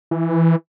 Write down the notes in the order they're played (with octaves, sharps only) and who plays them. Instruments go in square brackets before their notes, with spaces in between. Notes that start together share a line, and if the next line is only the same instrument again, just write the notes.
[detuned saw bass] E3